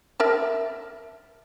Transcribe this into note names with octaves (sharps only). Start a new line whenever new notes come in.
A#4 E5 A5